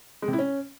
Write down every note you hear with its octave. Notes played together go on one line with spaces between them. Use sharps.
G#3
C3
E4
C#4